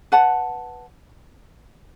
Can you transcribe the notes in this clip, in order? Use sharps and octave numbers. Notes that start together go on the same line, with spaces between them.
B4 F#5 A5